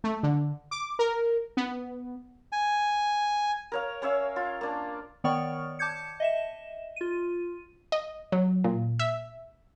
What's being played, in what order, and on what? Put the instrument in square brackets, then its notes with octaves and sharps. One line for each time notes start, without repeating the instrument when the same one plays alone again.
[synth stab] A3
D3
D6
A#4
B3
[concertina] G#5
[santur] A#4 C#5 F5
C#4 C#5 E5 F5
F4
A#3 D4
[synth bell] D#3 B3 C#5 D5 C#6 F6
A5 D6 G6 G#6 C#7
D#5 E5 E7
F4 D#7
[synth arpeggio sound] D#5
F#3
A#2
E5